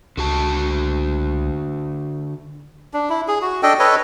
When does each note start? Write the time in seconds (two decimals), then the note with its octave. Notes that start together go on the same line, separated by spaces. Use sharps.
0.17 C#2 D3 F#4 A5
2.94 D4
3.10 E4
3.28 G#4
3.42 F#4
3.63 D4 A4 D#5 G5
3.79 A4 B4 C#5 D#5